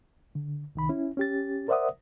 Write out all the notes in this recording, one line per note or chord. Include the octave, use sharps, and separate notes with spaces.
D3
C2 D#3 B5
C#4 E4
C#4 G4 A6
A#4 C5 D5 E5 F#5 D#6